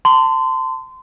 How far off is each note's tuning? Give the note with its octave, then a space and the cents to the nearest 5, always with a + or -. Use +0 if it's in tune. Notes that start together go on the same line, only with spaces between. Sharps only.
A5 +30 C6 -25